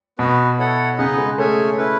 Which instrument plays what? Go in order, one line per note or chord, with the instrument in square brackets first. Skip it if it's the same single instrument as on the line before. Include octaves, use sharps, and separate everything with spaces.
[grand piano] B2 [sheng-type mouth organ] B3 F#4 B4
[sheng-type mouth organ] E4 A4 C#5 F#5
[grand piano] C#3 [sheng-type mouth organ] B3 D#4 G#4 B4 D#5
[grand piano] G#3
[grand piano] A3 [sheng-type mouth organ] C#4 G#4 C#5 E5 G#5
[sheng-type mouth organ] C#4 E4 B4